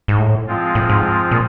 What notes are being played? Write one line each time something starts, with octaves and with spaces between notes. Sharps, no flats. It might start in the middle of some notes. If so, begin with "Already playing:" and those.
G#2
A2
F3 G#3 C4 F4
A2
G#2
A#2